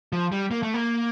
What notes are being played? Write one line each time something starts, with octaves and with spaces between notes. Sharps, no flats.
F3
G3
A#3
A3
A#3